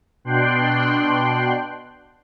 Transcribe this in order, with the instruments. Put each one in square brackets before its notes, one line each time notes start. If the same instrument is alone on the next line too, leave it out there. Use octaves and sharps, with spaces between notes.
[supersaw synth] B2 D4 G5 C6 F#6